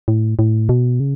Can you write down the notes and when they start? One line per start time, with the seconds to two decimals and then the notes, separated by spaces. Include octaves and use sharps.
0.08 A2
0.39 A2
0.69 B2
1.00 C#3